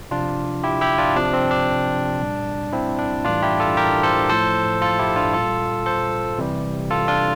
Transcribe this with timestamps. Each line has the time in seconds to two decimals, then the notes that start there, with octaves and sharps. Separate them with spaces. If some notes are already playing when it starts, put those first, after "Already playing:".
0.11 C3 F3 D4 F4
0.63 E4 G4
0.81 E4 G4
0.98 D4 F4
1.16 C3 F3 D4
1.33 C4
1.51 D4
2.20 A#2 G3
2.73 C4 E4
2.99 D4
3.24 A2 E3 G3 D4 F4
3.42 E4 G4
3.60 F4 A4
3.77 G4 A#4
4.03 A4 C5
4.29 A2 F3 A4 C5
4.82 F4 A4
4.99 E4 G4
5.16 D4 F4
5.34 A#2 G3 F4 A4
5.86 A4 C5
6.38 C3 E3 G3
6.91 F4 A4
7.08 D4 F4